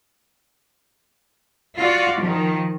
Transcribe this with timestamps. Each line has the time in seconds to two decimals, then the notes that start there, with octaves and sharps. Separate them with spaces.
1.78 F4 F#4 D5
2.20 D#3 F3